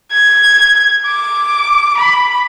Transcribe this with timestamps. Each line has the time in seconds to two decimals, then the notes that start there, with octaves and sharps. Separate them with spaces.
0.12 G#6
1.06 D6
1.97 B5